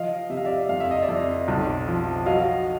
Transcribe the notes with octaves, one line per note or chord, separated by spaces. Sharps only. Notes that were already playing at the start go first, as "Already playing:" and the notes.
Already playing: F3 D#5 F5
C3 E5
F5
D5 E5
F2 F5
E5
D#5
D5 E5
F2
B1
F3
F#3 D#5 F5